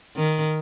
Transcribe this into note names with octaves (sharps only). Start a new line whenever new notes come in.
D#3